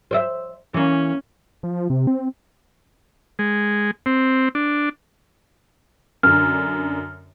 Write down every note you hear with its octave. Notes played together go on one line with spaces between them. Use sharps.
C5 D5 E5
E3 A#3 C#4
F3
C3
C4
G#3
C4
D4
F#2 D3 F6